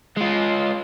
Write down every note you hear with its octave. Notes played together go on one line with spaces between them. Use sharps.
G#3 F4